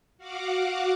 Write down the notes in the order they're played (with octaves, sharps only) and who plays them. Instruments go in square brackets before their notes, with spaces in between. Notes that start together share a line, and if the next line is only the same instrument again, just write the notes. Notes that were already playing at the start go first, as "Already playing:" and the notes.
[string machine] F#4 F5 F#5 D6